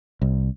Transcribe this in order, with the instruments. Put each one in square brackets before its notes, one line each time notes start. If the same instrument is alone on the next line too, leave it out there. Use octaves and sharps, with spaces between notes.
[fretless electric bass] C2